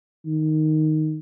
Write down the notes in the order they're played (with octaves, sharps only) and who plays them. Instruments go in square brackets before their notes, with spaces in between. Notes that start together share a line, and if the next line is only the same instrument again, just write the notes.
[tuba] D#3